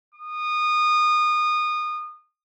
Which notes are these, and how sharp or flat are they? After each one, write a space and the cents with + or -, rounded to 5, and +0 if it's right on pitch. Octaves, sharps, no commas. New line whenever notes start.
D#6 -25